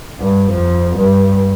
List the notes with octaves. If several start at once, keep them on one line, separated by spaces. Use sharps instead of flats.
G2
F2
G2